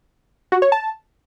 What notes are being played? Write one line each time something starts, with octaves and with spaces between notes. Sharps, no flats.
F#4
C#5
A5